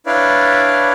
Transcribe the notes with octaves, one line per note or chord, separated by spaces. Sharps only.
D4 E4 B4 C#5 D5 F5